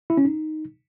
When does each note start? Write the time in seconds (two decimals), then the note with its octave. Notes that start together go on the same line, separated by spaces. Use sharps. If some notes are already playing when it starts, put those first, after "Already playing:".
0.10 E4
0.17 C#4
0.25 D#4